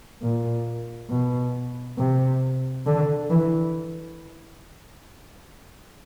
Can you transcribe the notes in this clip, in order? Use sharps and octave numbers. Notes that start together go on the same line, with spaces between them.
A#2
B2
C3
D3
E3